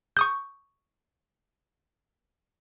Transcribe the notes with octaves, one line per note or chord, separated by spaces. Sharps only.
C#6 D#6 G6